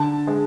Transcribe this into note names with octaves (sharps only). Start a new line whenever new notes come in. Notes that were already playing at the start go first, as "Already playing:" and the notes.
Already playing: D3 A5
G#3